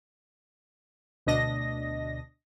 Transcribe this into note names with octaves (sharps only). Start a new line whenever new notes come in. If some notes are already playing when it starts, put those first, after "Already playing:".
D2 B2 D4 D#5 A#6